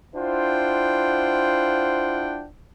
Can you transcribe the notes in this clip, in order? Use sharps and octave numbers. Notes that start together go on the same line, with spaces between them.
D4 E4 F4 C5 F#5 G5